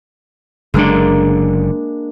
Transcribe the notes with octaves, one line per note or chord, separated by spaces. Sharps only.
F#1 D3 G#3 A#3 D4